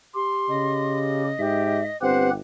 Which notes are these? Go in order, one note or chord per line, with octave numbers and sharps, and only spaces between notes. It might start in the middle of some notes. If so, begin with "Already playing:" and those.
G4 C6
C#3 D#5
G#2 G4 E5
G1 C4 G4 B4 C5 F#5